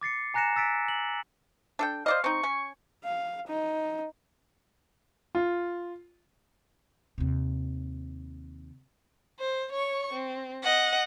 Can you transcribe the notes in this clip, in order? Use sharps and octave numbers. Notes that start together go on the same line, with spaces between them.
D6 A6 C7 C#7
G#5 A#5 F#6 A#6 C#7 E7
E6 A6 B6 D7
F#7
D4 A4 G5
C5 D5 D#5 F5
C4 D#4 C#6
C#4 G#5
F5
D#4
F4
D#2 C3
C5
C#5 C#6
C4
D#5 F#5